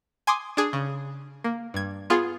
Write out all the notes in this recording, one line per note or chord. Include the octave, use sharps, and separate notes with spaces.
G#5 C6 D6 D#6
D4 G#4
C#3
A#3
G2 G#6
B3 F4 G#4